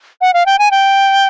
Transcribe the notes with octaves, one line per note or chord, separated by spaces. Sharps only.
F#5
F5
G5
G#5
G5